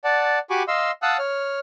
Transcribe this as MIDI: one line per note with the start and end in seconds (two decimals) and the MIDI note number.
0.04 0.39 74
0.04 0.39 78
0.04 0.39 81
0.50 0.63 66
0.50 0.63 67
0.50 0.63 80
0.50 0.63 83
0.50 0.63 85
0.50 0.63 86
0.68 0.91 75
0.68 0.91 77
0.68 0.91 84
0.68 0.91 88
1.02 1.17 77
1.02 1.17 78
1.02 1.17 81
1.02 1.17 87
1.02 1.17 88
1.02 1.17 90
1.19 1.59 73
1.19 1.59 89